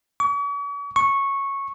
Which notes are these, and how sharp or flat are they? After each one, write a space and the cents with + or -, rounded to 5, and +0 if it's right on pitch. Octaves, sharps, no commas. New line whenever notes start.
C#6 +45
C#6 -10